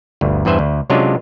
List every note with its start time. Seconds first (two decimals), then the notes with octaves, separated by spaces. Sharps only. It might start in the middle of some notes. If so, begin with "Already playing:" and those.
0.21 G1 D2
0.45 E2 G2 B4 C5 E5 G#5
0.59 D2
0.90 C3 F#3 G#3 C#4 D4 F4